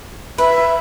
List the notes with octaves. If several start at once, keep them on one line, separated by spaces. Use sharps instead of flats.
B4 E5